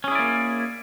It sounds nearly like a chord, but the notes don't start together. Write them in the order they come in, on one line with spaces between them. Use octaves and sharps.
C#4 G#4 E4 D5 A#3